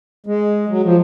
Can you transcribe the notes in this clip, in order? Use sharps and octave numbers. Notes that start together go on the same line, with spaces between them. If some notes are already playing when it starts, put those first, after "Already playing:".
G#3
F#3
F3